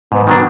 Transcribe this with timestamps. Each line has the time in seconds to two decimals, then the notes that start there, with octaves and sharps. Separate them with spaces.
0.12 G#2 B3
0.27 D#3 F#3 D4